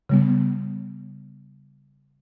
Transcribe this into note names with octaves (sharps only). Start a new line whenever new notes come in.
C#3 G3 B3